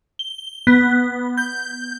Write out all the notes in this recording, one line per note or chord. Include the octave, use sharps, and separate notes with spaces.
G7
B3
G6